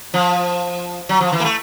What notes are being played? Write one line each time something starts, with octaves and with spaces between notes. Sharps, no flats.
F3
F#3
F3
E3
A#3
A3